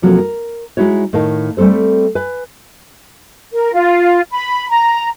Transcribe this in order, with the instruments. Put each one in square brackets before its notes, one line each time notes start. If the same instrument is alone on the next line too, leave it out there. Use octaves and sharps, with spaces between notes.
[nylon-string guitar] C3 F3 F#3 A#3 C4 A4
A#4
G#3 D#4 E4 F#4 C#5
A2 D#3 A#4 D#5 F5 A5
G3 A3 C4 A4 C5
B4 G#5
[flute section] A#4
F4
B5
A#5